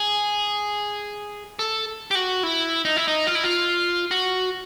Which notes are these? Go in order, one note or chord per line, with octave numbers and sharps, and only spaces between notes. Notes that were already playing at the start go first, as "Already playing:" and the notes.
Already playing: G#4
A4
G4
F#4
E4
D#4
E4
D#4
F4
E4
F4
F#4